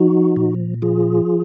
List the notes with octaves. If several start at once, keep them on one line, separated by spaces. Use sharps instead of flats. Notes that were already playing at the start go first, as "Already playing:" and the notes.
Already playing: F3 D#4 F#4
A#2
F3 F4 G#4